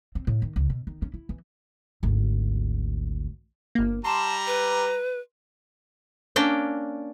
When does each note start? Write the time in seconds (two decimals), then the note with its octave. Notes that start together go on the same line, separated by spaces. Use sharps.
0.15 C4
0.27 A2
0.42 D#3
0.56 C#2
0.70 B2
0.87 D#3
1.02 C#4
1.14 E4
1.29 E3
2.03 G#1 D2
3.75 G1 A#3
4.05 G3 A5 A#5 C6
4.47 B4
6.36 A#3 C#4 D4 G5